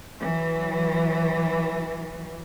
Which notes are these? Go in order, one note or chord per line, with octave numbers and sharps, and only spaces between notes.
E3 F#3